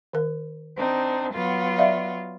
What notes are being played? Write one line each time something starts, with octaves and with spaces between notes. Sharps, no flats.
D#3 A#4
C4 D4 D#4
F#3 B3 F4
D5 E5 F5